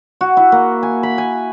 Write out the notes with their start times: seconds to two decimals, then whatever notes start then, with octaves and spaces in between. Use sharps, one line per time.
0.21 F#4
0.37 E4
0.52 A#3
0.83 G#5
1.03 B5
1.18 G#5